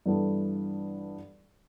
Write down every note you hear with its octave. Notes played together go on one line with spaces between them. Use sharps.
G2 E3 B3 D4 A4